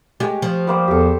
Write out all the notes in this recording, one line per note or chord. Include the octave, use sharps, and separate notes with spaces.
G#3 G4 C#5
F3
G3 A#3 C5
E2 G4 A4